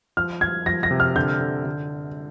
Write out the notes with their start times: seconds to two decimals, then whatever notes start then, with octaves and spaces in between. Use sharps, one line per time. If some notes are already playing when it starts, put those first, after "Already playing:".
0.17 F3 F6
0.41 F3 G#6
0.66 F3 A#6
0.83 A#6
0.91 C3
1.00 F6
1.16 D3 G6
1.41 D3
1.65 D3